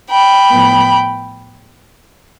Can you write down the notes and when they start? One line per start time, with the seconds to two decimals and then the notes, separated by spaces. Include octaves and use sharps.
0.10 G5 B5
0.50 A2 F3 B3